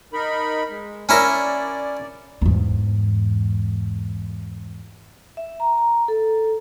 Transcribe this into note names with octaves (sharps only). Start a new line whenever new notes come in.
D#4 A#4 B5
G#3
C#4 E4 A#4 D5
E2 G#2
E5
A#5
A#5
A4